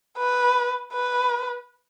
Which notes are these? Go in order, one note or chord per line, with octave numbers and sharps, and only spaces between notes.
B4
B4